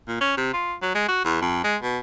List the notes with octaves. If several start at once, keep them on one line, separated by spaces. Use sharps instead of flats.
A#2
C#4
C3
F4
F#3
G#3
F#4
E2
F2
G#3
B2